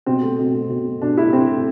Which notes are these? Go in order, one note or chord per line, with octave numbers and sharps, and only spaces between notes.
B2 C4
A3
B2
A3
B2
A3
B2 D4
A3 E4
B2 C4
A3